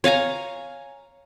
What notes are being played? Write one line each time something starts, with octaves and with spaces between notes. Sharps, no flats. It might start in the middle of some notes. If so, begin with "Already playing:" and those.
C#5 F5 G#5 A#5